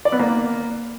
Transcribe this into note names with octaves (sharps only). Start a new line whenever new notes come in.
D5
B3
A#3